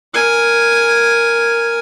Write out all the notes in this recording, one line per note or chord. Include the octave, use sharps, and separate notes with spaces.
A#4 G#5